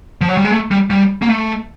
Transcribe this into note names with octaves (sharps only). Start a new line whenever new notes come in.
F3
F#3
G3
G#3
A3
G3
G3
A#3
A3